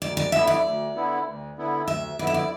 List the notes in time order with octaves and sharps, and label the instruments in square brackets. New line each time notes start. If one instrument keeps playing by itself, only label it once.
[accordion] D2 [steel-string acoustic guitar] D5
[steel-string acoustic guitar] D5
[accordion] D3 B3 E4 [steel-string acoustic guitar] E5
[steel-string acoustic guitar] D5
[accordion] D2
D3 B3 E4
D2
D3 B3 E4
[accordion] D2 [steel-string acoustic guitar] E5
[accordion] D3 B3 E4 [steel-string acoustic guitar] D5
[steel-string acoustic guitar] E5
D5